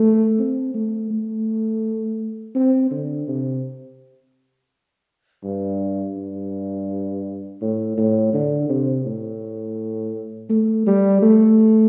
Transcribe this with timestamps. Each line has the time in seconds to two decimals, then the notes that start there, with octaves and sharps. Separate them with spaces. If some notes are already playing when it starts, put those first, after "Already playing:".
Already playing: A3
0.38 C4
0.74 A3
1.11 A3
2.55 C4
2.91 D3
3.28 C3
5.44 G2
6.17 G2
7.61 A2
7.97 A2
8.33 D3
8.69 C3
9.05 A2
10.50 A3
10.86 G3
11.22 A3